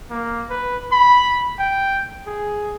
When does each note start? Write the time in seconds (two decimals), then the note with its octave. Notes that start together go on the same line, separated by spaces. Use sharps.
0.10 A#3
0.50 B4
0.92 B5
1.60 G5
2.27 G#4